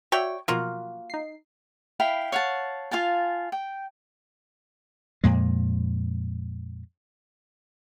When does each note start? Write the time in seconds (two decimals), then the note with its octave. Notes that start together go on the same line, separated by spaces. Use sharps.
0.12 F#4 C#5 D5 E5 G5
0.48 B2 F3 F#3 A#3 F4 F#4
1.10 D#4 C7
2.00 E4 F5 G5 B5
2.32 C#5 F5 F#5 A5
2.91 F4 F5 G#5 A5
3.52 G5
5.24 F2 A#2 G#3